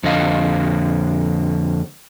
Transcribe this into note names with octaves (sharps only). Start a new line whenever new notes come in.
F2 D3 D#5 F5